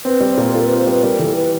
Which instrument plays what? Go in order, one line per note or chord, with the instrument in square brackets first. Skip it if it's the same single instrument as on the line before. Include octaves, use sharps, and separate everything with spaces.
[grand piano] C4 [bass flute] B4
[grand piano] G3
[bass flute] C5
[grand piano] A#2
[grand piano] F4 [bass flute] A4
[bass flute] A#4
[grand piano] C4 [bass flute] B4
[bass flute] C5
[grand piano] G3 [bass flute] B4
[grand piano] G3 [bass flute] A#4
[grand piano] E3 [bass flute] A4
[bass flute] B4